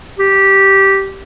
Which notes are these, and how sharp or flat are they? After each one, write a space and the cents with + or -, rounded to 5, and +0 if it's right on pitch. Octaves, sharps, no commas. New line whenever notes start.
G4 -10